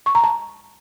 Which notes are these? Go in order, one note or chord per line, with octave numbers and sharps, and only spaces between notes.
C#6
A#5
A5